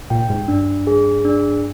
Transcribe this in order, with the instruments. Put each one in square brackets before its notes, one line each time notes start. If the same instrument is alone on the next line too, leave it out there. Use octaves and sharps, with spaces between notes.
[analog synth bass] A#2 [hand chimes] G5
[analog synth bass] G#2
[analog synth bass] G2 [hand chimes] D4
[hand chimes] G#4
D4